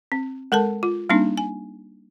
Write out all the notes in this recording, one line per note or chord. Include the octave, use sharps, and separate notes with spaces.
C4
G#3 A4 A#4 A5
F4
G3 A#3 C4 D4 D#4
G#5